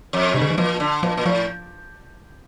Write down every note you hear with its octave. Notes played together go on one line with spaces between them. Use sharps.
F2
G2 C3
D3
E3
A#2 F3
D3
A#2 F3
A#2
A2 F3